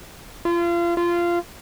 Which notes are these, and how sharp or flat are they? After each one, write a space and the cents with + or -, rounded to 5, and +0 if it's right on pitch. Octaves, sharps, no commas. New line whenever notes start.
F4 -30
F4 -15